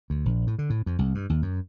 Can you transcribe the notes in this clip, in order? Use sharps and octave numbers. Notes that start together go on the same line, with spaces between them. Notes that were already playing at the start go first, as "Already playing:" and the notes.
D2
A#1
A2
D3
A2
F2
C2
G2
D#2
F#2